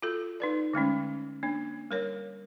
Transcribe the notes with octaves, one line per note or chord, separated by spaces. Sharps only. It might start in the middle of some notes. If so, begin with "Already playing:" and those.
F4 F#4 A4
D#4 B4 D5
D3 G#3 A3 C#4
A#3 D4
G3 A#4 C#5